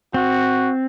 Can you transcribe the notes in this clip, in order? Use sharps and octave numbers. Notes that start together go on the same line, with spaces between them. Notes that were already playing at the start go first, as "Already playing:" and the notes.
C4 F#4